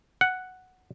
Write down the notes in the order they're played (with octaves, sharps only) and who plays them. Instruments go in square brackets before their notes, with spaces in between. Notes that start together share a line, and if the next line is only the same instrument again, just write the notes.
[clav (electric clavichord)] F#5